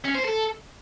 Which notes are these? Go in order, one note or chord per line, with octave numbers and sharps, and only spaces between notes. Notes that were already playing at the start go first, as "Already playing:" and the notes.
C#4
C5
A4